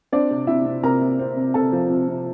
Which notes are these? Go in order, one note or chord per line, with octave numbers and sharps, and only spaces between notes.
C4 D4 D5
C3
C3 E4 E5
C3
C3 A#4 A#5
C3
C4
C3
C3 A4 A5
F3
C3
C3